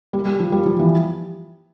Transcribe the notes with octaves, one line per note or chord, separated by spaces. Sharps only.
G3
G3
F3
G3
F3
E3